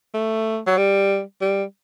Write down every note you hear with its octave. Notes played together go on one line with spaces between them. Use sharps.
A3
F#3
G3
G3